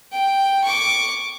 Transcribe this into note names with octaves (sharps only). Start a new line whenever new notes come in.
G5
C#6 D6